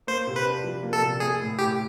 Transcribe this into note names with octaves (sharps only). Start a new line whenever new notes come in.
A#3 C5
C3
B4
D4
F3
A#3
A4
C3
A#3 G#4
A2
A2 G4